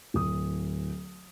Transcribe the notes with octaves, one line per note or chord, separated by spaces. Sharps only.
D1 D#6